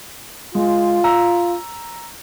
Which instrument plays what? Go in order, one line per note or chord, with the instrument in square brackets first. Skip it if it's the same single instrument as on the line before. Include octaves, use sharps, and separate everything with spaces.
[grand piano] G#3 [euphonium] F4
[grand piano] A#5 E6